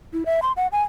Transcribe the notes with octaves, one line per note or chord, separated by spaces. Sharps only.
E4
E5
C6
F#5
G#5